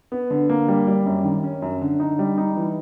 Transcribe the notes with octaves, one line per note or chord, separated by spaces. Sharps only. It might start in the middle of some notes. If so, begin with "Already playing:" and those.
B3
D3
A#3
G3
G3
F#2
D#3
C#4
F#2
D3
D#4
G3
D#4
E3